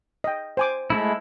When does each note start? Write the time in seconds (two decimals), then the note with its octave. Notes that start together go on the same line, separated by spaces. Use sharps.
0.24 D#5 G5
0.57 C5 G#5 D6
0.90 G#3 A3 E4